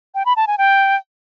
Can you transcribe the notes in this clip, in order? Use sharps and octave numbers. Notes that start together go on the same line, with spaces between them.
G5
B5
A5
G#5
G5